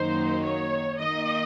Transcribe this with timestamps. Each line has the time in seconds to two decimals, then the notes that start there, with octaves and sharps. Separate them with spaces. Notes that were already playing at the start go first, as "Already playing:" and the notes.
Already playing: F#2 D#3 F#3 A#3 D#4 C5
0.43 C#5
0.97 D#3 A#3 D#4 D#5